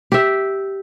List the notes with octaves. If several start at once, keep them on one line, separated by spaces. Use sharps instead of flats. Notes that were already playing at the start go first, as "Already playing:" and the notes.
G4 E5